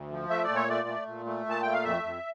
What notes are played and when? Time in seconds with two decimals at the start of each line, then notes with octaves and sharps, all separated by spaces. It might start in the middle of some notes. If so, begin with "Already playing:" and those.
Already playing: D2
0.11 F3
0.30 A3 E5
0.44 D5
0.49 A#2
0.56 C#5
0.68 A3 D5
0.88 A3
1.07 A#2
1.26 A3
1.46 A#2 A5
1.62 A3 G5
1.72 F5
1.84 F2 E5
2.03 F2